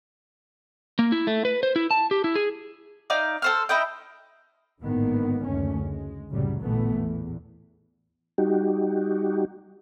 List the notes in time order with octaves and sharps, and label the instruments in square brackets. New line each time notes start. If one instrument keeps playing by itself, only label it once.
[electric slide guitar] A#3
E4
A3
B4
C5
E4
A5
G4
E4
G#4
[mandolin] D#4 D5 F5
A4 C5 F6
D#4 E4 D#5 G5
[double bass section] G#1 A2 D3 D#3 A#3 B3
F#1 D2 A3 C#4
G#3
F#1 C2 A2 C#3 F#3 G3
A1 D2 A#2 E3 A3 B3
E2
[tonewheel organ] G3 D#4 F#4 G4